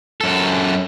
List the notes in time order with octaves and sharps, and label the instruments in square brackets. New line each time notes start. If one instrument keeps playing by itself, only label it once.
[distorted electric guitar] F#2 A4